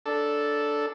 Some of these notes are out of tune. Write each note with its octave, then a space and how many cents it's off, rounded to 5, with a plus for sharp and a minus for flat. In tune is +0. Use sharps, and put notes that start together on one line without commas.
D4 +0 A4 +0